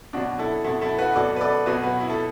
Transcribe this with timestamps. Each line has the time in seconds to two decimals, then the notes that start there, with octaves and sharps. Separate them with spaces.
0.13 B2 D4 F#4
0.17 F#3
0.39 E4 A4
0.64 B2 F#3 E4 A4
0.81 E4 A4
0.98 F#4 B4
1.16 B2 F#3 A4 D5
1.36 B4
1.41 A4 D5
1.66 B2 F#3 F#4 B4
1.83 F#4 B4
2.01 E4
2.10 A4